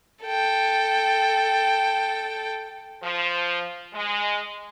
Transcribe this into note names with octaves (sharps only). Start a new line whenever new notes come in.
A4 G5
F3
G#3